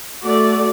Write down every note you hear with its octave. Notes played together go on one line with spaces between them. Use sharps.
A3 F#4 D5